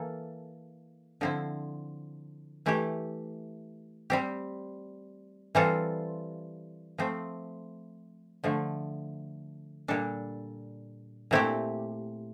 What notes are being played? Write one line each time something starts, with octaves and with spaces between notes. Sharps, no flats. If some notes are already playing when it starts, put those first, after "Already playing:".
Already playing: E3 A#3 A4
D3 F3 C4 E4
E3 A3 E4 G4
G3 C4 G4
E3 G3 C4 F4 A4
F3 A3 C4
D3 F3 A3
A#2 G3 D4 A4
A#2 A3 C4 E4 G4